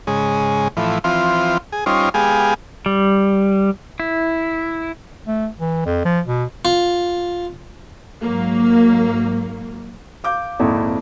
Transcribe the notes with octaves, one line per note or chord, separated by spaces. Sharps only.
G#2 C#3 G#3
A2 E3 F3
E3 F3 C4 F4
G#4
G3 C#4 D#4 F4 C5
G#3 B3 G4 G#4 F5
G3
E4
A3
E3
F2
F3
B2
F4
G#2 F#3 A#3
F5 D6 G6
G#1 F2 A#2 E4